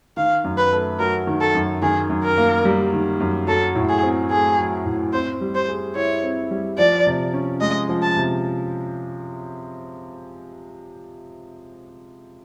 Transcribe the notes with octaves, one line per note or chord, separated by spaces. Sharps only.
D#3 F5
F#2
B4
A3
F#3 A#4
D#3
A4
F#2
D#3 G#4
F#2
A#4
A#3
G3
D#3
F#2
F#3 A4
A2
G#4
C4
A3 G#4
F#3
A2
C4 C5
G3
C5
G#4
E4 C#5
C4
G3
F3 D5
C3
C#4
G#3 D#5
F3
A5
C3